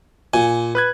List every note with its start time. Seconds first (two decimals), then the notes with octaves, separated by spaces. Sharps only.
0.34 A#2 G#5
0.75 B4 F#6 G#6